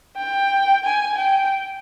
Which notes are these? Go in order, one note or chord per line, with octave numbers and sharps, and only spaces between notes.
G5
G#5
G5